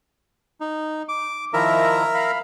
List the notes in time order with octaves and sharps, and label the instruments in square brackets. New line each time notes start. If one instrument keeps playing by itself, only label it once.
[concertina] D#4
D6
[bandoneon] D#3 F3 E4 [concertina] A#4 E5 A#5
[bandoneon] F5 B5